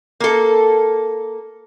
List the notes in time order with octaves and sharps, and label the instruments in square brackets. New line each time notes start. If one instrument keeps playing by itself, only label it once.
[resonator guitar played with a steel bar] A#3 A4